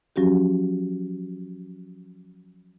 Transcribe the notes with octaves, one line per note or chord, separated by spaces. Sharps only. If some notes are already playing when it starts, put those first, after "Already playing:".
F3 F#3 C#4 F#4 G4